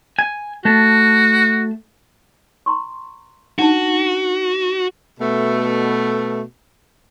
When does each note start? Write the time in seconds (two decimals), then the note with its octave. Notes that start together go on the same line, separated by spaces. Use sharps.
0.19 G#5
0.65 A3 F#4 A5
2.66 A#5 C6 C#6
3.59 D4 D#4 F#4 A5
5.20 B2 A3